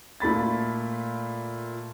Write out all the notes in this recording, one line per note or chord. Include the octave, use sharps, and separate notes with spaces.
A#2 A3 B5 A6